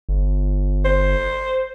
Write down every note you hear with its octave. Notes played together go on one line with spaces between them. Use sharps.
G1
C5